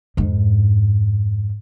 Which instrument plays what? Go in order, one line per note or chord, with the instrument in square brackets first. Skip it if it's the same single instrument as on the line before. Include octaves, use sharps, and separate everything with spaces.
[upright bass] F2 G#2